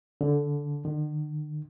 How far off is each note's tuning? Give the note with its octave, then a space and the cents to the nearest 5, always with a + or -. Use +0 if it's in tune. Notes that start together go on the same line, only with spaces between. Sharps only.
D3 -15
D3 +45